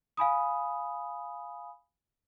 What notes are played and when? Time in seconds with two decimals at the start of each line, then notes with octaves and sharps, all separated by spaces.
0.17 F5 G#5 B5 D#6